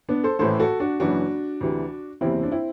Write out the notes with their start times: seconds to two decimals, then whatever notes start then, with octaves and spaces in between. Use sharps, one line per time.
0.09 B3 D4
0.24 A4 C5
0.39 A1 A2 E3 A4 C5
0.60 F#4 A4
0.80 D4 F#4
1.00 F#1 F#2 E3 D4 F#4
1.61 D2 C3 E3
2.21 F#1 E2 C3 C4 E4
2.43 D4
2.51 C4 E4